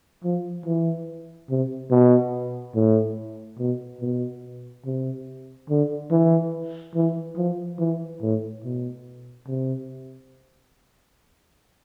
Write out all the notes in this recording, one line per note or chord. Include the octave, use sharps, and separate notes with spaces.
F3
E3
C3
B2
A2
B2
B2
C3
D3
E3
E3
F3
E3
A2
B2
C3